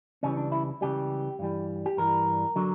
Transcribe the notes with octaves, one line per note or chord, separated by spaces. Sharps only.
C#2 C#3 E3 G3 C#4
D4
E4
C#2 C#3 E3 G3 G4
G2 E3 G3
G4
G2 E3 G3 A#4
D3 F#3